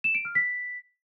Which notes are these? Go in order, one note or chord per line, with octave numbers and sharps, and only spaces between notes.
E7
D7
F6
B6